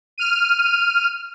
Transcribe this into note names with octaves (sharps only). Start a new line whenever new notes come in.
F6 D#7